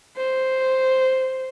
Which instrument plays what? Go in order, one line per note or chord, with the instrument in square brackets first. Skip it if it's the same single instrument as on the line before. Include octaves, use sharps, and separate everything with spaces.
[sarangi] C5